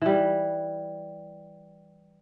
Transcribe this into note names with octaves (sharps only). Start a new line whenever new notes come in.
E3 G3